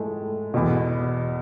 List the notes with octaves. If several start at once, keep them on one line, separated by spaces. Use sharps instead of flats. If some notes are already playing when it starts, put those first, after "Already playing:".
Already playing: A2 G#3 A3
E2 B2